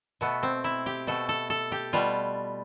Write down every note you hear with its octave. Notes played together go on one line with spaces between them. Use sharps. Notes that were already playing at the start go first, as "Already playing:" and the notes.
B2 A3 B3
C4
E4
G4
B2 A3 A4
A4
A4
G4
B2 G3 F4